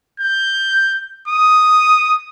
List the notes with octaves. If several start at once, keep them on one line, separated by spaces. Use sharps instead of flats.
G6
D#6